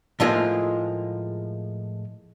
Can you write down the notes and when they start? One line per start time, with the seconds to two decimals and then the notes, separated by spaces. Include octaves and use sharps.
0.20 A2 F3 G#3 A#3 F4 G#4